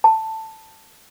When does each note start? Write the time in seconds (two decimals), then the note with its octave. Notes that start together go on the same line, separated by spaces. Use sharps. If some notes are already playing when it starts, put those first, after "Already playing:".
0.04 A5